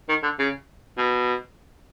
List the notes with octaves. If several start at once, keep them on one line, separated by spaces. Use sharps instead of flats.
D#3
D3
C#3
B2